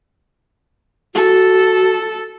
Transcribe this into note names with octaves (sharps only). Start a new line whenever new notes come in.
F#4 A4